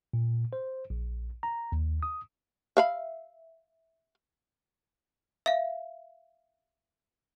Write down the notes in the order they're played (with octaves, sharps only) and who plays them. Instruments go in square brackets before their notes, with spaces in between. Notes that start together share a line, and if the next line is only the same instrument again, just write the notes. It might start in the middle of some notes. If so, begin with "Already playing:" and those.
[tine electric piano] A#2
C5
A#1
A#5
D#2
D#6
[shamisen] E5 F5 B5
[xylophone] E5 F5